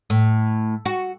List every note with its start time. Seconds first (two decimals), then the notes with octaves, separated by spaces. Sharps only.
0.10 A2
0.85 F#4